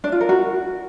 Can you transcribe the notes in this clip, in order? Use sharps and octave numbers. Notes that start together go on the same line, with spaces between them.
D4
F4
A#4
F#4